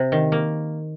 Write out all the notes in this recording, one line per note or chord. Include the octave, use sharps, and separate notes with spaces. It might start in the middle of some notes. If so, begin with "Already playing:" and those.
Already playing: C3
D#3
A#3